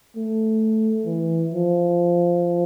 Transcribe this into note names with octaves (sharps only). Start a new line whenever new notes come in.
A3
E3
F3